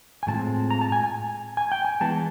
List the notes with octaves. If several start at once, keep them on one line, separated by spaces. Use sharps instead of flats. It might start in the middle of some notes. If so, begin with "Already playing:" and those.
G#5
A2 E3 G#3 C4 F4 A5
A#5
A5
G#5
G#5
G#5
G5
G#5
E3 G#3 B3 A5